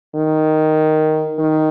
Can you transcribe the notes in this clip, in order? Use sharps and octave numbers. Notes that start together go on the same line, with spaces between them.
D#3
D#3